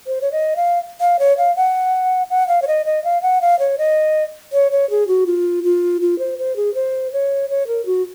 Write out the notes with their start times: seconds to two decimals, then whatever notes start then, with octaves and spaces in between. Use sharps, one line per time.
0.07 C5
0.21 C#5
0.32 D#5
0.56 F5
1.00 F5
1.19 C#5
1.38 F5
1.56 F#5
2.30 F#5
2.48 F5
2.62 C#5
2.68 D#5
2.86 D#5
3.04 F5
3.22 F#5
3.41 F5
3.59 C#5
3.78 D#5
4.53 C#5
4.72 C#5
4.90 G#4
5.08 F#4
5.26 F4
5.64 F4
6.01 F4
6.19 C5
6.38 C5
6.56 G#4
6.74 C5
7.13 C#5
7.50 C#5
7.67 A#4
7.86 F#4